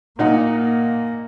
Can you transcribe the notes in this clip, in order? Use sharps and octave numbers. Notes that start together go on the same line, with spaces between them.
A#2 A#3 D#4 F#5